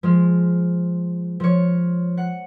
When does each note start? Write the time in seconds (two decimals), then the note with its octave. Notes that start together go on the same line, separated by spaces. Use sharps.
0.03 F3 G#3
1.40 F3 C#5
2.17 F#5